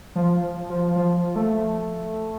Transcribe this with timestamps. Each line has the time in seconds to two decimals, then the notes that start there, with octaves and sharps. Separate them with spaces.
0.16 F3
0.70 F3
0.96 F3
1.36 A3